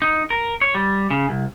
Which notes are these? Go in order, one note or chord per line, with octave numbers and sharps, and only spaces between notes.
D#4
A#4
C#5
G3
C#3
C2